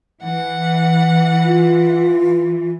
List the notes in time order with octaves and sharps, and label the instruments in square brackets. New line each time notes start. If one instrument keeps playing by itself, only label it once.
[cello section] E3 [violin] F#5
[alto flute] F4